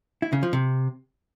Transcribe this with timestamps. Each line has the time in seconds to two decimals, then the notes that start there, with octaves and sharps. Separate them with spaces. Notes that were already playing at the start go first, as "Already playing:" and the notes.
0.22 E4
0.33 C#3
0.43 F3
0.53 C3